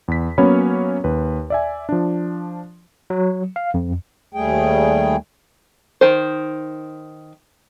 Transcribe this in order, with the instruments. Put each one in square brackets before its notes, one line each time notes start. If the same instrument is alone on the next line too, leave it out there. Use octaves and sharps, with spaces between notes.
[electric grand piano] E2 B6
F#3 A#3 B3 C#4 C#5 B5
D#2 B4
D5 E5 G#5
F3 D4
[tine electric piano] F#3
F5
F2
[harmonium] D#2 G3 A3 G#4 G5
[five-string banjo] D#3 C5